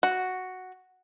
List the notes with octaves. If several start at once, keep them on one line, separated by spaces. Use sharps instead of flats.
F#4